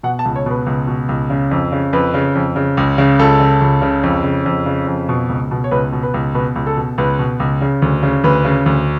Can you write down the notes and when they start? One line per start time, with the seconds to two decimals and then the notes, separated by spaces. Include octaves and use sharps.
0.03 B2 F#5
0.19 A5
0.25 C#2
0.36 C#5
0.46 B2 B4
0.67 C#2
0.87 B2
1.09 C#2
1.30 C#3
1.51 F2
1.72 C#3
1.93 F2 B4
2.14 C#3
2.35 F2
2.56 C#3
2.77 C#2
2.98 C#3
3.19 C#2 A4
3.40 C#3
3.61 C#2
3.82 C#3
4.03 F2
4.24 C#3
4.46 F2
4.66 C#3
4.87 F2
5.09 B2
5.29 C#2
5.51 B2
5.64 C#5
5.71 C#2 B4
5.92 B2
6.03 B4
6.14 C#2
6.34 B2 B4
6.56 C#2
6.67 A4
6.77 B2
6.98 C#2 B4
7.19 B2
7.40 C#2
7.61 C#3
7.82 D2
8.03 C#3
8.24 D2 B4
8.45 C#3
8.66 D2